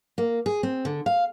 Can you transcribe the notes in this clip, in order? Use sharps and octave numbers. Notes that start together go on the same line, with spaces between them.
A#3
G#4
C4
D3
F5